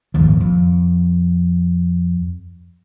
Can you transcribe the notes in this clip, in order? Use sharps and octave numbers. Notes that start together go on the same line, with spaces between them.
D#1 G#1 D#2 F3
F2